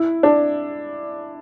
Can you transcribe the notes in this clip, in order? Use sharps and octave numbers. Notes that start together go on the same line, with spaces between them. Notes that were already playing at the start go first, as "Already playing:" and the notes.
Already playing: E4
D4